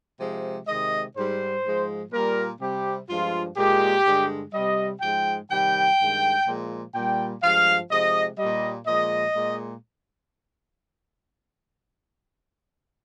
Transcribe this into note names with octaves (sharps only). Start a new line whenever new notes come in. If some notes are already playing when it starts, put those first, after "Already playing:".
C3 F3 G#3
C3 D#3 G#3 D#5
G#2 G3 C5
G#2 F3 G#3
A#2 G3 A#4
C3 G3 G4
G2 F3 G#3 F4
A#2 G#3 G4
G2 D3 G#3
C3 G3 D#5
G#2 F3 G#3 G5
C3 D#3 G3 G5
G2 D#3 G#3
A#2 F3 G#3
A#2 G3 G5
G2 F3 G#3 F5
C3 F3 G#3 D#5
A#2 G3 D#5
A#2 F3 G#3 D#5
A#2 G#3